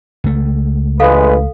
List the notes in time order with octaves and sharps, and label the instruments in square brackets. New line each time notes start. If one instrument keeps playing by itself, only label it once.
[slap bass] C#2 A3
[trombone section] A1 G#3 B4 [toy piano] A4 F5